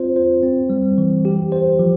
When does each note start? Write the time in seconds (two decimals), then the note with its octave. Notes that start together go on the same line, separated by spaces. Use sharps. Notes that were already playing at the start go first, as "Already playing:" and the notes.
Already playing: C4 F4 C5
0.16 C5
0.43 C4
0.70 G3
0.98 E3
1.25 G4
1.52 C5
1.79 F3